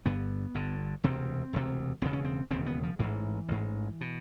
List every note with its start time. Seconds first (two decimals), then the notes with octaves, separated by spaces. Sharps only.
0.05 G1 G2 D3 B3
0.54 G1 G2 D3
1.04 E1 D2 C3 C4
1.53 E1 D2 C3
2.02 E1 D#2 C#3 C4
2.13 C#4
2.24 C4
2.51 E1 D#2 C#3 C4
2.66 B3
2.83 F3
2.99 A1 G#2 E3
3.48 A1 G#2
4.01 B2